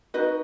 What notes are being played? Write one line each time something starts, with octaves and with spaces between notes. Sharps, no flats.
D#4 F#4 B4 D#5